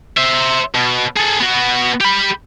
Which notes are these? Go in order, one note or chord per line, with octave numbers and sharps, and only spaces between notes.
C5 E5
B2
G#4 A4
B3 F#4
G4 B5